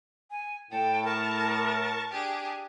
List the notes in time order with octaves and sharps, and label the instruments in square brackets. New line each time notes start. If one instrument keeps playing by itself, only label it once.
[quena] G#5
[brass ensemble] A2 [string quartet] A4 [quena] G5
[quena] A#4 [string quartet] A5 C#6
[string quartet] D4 G4 G#4